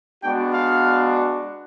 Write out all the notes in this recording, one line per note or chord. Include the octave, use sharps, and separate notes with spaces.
G#3 B3 D4 F#4 G5
F5